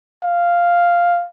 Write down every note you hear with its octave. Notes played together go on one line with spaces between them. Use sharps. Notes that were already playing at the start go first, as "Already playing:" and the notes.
F5